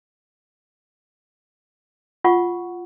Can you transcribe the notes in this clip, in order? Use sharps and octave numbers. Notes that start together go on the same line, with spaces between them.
F4 F#5 C#6